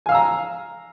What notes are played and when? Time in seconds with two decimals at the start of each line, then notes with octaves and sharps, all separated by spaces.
0.06 G#5
0.09 F5
0.12 E6
0.14 A#5